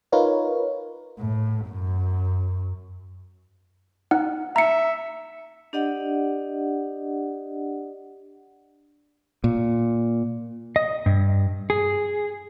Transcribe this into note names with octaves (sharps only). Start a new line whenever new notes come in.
D#4 F4 A#4 B4 C#5
A2
F#2
D#4 F#5
E5 A#5 C#7
D4 G4 D5 D#5 F#5
A#2
D#5
G2
G#4